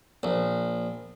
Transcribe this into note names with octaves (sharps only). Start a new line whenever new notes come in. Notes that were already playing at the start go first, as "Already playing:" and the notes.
A#1